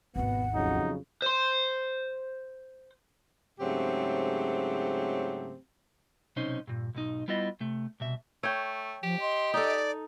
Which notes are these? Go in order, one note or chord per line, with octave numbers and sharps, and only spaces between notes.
G#1 D#2 B2 B3 F#5
F2 C#3 F#3 D#4
C5 C6
G#2 C#3 F#3 A3 C4 G4
B1 C3 C#4 D#4 C5
G2 A#2
B1 G#2 D#4
G3 B3 E4 F4 D#5
C3 A3
C2 B2 E5
A3 C#5 G5
F3 G4
D#5 C6
D#4 A4 D5